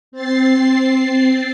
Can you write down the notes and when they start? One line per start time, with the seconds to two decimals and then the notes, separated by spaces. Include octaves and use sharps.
0.12 C4 A6 C7